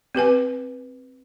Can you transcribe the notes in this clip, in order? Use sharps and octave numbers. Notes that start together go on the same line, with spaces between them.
C4 G4 B4 G#5